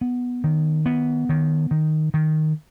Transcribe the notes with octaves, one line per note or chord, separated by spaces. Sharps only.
B3
D#3
B3
D#3
D#3
D#3